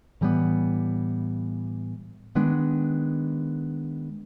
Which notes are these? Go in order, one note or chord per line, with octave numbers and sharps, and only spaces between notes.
A2 E3 G3 B3
D#3 G#3 B3 D4